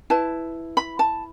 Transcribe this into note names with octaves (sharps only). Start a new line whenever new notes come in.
E4 B4 A5
B5
A5